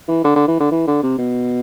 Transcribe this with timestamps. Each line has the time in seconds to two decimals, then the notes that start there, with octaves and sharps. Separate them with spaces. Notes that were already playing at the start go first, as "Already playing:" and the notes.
0.08 E3
0.24 D3
0.36 D3
0.48 E3
0.60 D3
0.71 E3
0.87 D3
1.03 C3
1.18 B2